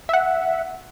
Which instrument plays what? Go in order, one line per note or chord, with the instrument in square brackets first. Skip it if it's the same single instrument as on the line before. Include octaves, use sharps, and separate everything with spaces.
[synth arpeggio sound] E5 F#5